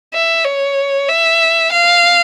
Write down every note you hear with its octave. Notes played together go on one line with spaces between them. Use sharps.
E5
C#5
E5
F5